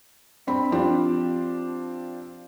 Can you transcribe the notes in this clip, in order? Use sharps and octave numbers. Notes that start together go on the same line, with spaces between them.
G2 C4 B5
F3 C4 D4 F4 G4